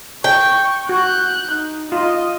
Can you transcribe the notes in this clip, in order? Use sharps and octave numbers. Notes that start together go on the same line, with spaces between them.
G5 C#6
F#4 F#6 G6
D#4
F4 D#5